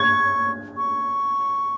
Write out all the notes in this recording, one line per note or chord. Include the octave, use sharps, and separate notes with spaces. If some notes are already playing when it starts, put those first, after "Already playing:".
Already playing: C#6 G#6
C#6